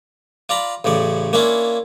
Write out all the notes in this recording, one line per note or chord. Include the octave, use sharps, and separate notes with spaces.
F4 D5 A#5 B5
A1 A2 C#3 D5
A#3 C#4 D4 E4 F4